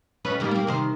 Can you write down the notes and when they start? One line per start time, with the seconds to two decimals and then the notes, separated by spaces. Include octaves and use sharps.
0.25 F2 C#4 B4
0.40 D#3 G3 A#3
0.51 A#3 C4
0.67 C3 D#3 C5